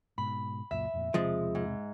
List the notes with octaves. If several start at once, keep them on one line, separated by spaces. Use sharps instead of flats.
G#2 B2 B5
C#2 F#2 A#2 E5
F1 F2 A#2
E1 C3 F3 G#3 C4
G#2